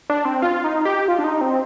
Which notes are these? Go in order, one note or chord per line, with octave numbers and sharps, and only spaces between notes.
D4
C4
F4
D#4
G4
F4
D4
D#4
C4